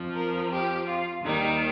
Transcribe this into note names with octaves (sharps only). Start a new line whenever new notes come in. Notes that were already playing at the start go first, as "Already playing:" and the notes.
Already playing: F2 F3
A#4
G4
F4
D#2 D#3 G3 D#4